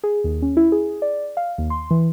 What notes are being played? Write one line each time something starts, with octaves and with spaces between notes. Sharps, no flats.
G#4
D#2
C#4
E4
G#4
D5
F5
D#2
C6
E3